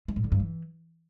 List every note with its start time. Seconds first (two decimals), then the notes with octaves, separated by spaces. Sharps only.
0.08 G#3
0.16 A2
0.24 D3
0.32 G2
0.40 E3